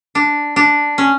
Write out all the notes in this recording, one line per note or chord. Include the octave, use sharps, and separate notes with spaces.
D4
D4
C#4